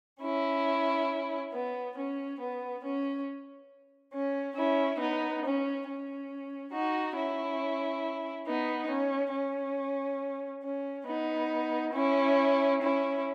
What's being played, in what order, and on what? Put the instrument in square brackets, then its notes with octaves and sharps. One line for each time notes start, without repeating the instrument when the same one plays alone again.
[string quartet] C#4 E4
B3
C#4
B3
C#4
C#4
C#4 E4
B3 D#4
C#4
C#4
D#4 F#4
C#4 E4
B3 D#4
C#4
C#4
C#4
B3 D#4
C#4 E4
C#4 E4